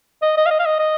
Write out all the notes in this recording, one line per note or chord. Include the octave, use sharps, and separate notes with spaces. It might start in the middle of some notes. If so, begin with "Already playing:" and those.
D#5
D#5
F5
D#5
F5
D#5
D#5